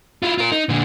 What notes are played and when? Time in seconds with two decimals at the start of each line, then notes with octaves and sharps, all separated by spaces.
0.23 E4 F4
0.38 F4 A#4
0.52 D#4
0.69 A#2 D3